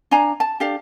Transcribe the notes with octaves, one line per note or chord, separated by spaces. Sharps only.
D4 F5 G#5 A#5
A5
D4 G4 A4 F5